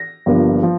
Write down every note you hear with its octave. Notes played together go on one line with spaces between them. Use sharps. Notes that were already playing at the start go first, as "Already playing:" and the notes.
Already playing: A#6
G1 G2 F3 A#3
F3